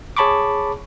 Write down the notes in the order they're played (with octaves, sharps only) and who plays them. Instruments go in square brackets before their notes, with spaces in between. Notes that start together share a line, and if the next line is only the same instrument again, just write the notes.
[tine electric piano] G#4 C#5 A5 B5 C#6 D6